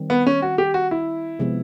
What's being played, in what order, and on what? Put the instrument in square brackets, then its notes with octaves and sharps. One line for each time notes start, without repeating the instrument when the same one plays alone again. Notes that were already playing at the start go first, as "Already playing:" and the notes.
Already playing: [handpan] D#3 G3 C4
[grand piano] B3
C#4
F#4
G4
F#4
E4
[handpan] C3 F3 G#3 B3